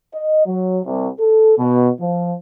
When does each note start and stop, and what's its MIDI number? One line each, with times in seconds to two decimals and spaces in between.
0.14 0.44 75
0.46 0.80 54
0.86 1.08 36
1.20 1.54 69
1.58 1.90 47
2.00 2.35 53